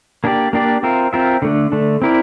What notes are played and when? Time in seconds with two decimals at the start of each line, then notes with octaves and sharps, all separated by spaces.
0.24 A#3 D4 G4 D5
0.53 A#3 D4 G4 D5
0.83 C4 F4 A#4 E5
1.13 C4 F4 A#4 E5
1.42 D3 A3 D4
1.72 D3 A3 D4
2.02 C4 E4 A#4 D5